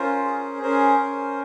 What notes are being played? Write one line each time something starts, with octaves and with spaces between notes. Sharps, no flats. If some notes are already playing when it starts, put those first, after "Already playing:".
Already playing: C#4 F4 A#4 C5
G#4
C#4 A#4 C5
C#4